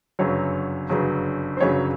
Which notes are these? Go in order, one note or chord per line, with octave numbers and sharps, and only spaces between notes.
G1 F#2 C#3 F#3 C#5
G1 F#2 C#3 F#3
C5
G1 F#2 C#3 F#3 C#5